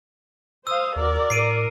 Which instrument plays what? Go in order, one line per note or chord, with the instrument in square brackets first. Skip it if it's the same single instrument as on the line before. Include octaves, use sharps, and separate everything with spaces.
[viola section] C5 F5 [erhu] D#6 [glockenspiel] E6
[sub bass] D#2 [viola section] F#4 A#4 [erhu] D5
[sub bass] A2 [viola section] A#4 [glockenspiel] C7 D7 D#7